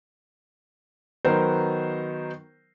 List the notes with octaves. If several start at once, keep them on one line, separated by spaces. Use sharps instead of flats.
D#3 F#3 B3 D#4 A#4 C5